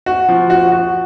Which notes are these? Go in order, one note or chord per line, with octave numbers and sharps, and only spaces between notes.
F#4
F3
F#4
F#4